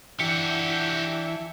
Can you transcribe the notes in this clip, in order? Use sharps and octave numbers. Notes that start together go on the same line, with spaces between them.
E3 D4 G4 E5 F#5 G5 C#7